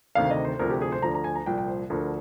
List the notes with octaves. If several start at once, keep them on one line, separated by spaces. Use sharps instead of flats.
D2 C3 D#3 F5
D#5
C5
D2 C3 F3 A#4
G4
G#4
C5
D2 D3 F3 A#5
A#5
G#5
A#5
C2 A#2 F3 G5
G5
C5
D2 D3 F3 A#4